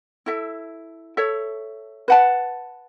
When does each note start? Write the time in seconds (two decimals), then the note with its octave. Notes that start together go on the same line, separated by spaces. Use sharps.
0.26 E4 A4 E5
1.17 A4 C#5 E5
2.08 B4 F#5 A5